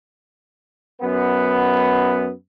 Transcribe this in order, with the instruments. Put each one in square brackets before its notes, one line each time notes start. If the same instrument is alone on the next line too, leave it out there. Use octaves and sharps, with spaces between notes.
[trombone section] F#2 B3